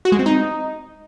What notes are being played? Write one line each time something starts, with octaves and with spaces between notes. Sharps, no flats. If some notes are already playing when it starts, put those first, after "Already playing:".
F#4
G#3
C4
D#4